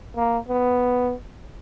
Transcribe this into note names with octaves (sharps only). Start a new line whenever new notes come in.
A#3
B3